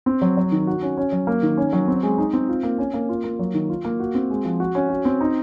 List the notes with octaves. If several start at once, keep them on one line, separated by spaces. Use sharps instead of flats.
C4
F#3
F#3
D#3
F#4
C#4
C#4
F#3
A#3
D#3
C#4
F#3
C4
G#3
D#4
C4
F4
A#3
C#4
A#3
F4
A#3
F#3
D#3
F4
A#3
F#4
C4
G#3
F3
F#4
C#4
F#4
C4
D#4